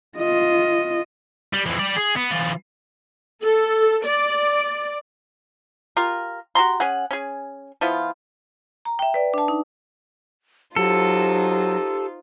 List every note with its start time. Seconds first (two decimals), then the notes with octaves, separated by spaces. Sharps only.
0.18 F4 D#5
1.53 G3
1.66 F2 E3
1.79 G3 D5
1.96 G#4
2.16 B3
2.31 E3 F4
3.43 A4
4.05 D5
5.97 F4 G4 A#4
6.55 F#4 G4 A#5 C6
6.80 C#4 G#4 F#5
7.11 C#4 G#4
7.81 F3 B3 E4 F4
8.85 A#5
8.99 E5 G5
9.14 B4 D5
9.34 D4 A5
9.48 D#4
10.76 F#3 D#4 F4 G4 A4 C5